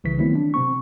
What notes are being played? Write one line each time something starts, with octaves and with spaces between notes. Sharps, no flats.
C2 C#3 E3 B6
D#3 F#3 A3 B3 C4 E4
D4
C3 C4 C#6